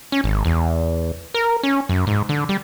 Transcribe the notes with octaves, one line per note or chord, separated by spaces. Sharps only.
C#4
G#1
E2
A#4
C#4
F#2
G#2
D3
G3